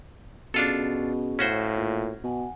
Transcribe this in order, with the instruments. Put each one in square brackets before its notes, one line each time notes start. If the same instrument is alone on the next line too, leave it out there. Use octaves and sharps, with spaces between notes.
[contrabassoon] B2 [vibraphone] C#4 G#4 [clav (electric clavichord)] D4 F4 A4
[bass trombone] A2 [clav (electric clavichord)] C#4 F#4 C5 [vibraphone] F5
[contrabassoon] A#2
[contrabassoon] B2 [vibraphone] F#5 G#5